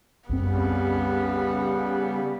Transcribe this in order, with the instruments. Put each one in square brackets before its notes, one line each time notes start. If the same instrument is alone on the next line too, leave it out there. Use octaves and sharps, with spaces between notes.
[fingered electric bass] C2 F#2 C4 [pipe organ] C#3 G3 [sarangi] B3